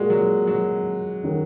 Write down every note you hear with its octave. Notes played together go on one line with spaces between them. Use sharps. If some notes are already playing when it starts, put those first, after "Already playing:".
Already playing: A#2 G#3 A#3 F#4
F#3
F#3
D#3 F#3 D#4